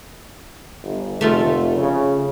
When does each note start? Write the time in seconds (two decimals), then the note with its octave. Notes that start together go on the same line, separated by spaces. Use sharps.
0.83 G1
1.21 F1 A3 F4 A4
1.76 C#3